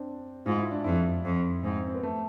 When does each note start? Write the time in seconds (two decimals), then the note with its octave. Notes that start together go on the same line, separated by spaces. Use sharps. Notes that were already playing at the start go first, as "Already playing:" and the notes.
Already playing: C4 D4
0.46 G#2 F4
0.58 E4
0.71 D4
0.84 F2 E4
1.25 F2
1.63 G#2 C4
1.87 C4
1.94 B3
2.03 A3